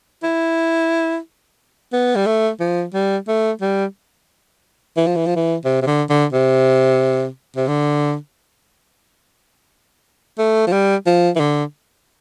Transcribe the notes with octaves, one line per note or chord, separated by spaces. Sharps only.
E4
B3
G3
A3
F3
G3
A3
G3
E3
F3
E3
F3
E3
C3
C3
D3
D3
C3
C3
D3
A3
F3
G3
F3
E3
D3